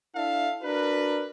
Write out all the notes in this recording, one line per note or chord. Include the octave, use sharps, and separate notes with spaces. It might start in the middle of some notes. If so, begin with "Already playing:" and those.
D4 E4 A4 E5 F5
D4 F#4 A#4 B4